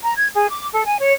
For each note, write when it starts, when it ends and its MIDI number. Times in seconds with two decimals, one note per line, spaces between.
0.02 0.12 82
0.16 0.28 92
0.35 0.46 68
0.50 0.67 86
0.72 0.83 69
0.85 0.96 80
0.99 1.13 73